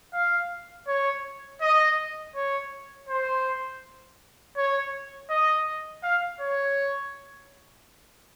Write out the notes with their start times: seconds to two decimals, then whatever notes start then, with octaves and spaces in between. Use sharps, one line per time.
0.13 F5
0.87 C#5
1.62 D#5
2.35 C#5
3.09 C5
4.56 C#5
5.30 D#5
6.03 F5
6.41 C#5